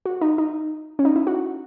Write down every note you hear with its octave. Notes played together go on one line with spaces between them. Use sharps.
F#4
D#4
D#4
C#4
D#4
E4
F#4